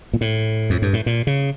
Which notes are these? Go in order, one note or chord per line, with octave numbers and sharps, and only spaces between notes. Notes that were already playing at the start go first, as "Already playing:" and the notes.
A#2
A2
F2
G2
A2
A#2
C#3